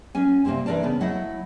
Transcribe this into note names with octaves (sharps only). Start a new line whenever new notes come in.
F#3 C#4 G#5
C3 F#3 G3 A#3 C4
E3 D4 A#4 D5 A5
C#3 B3
F#3 A3 E4 D#5 F#5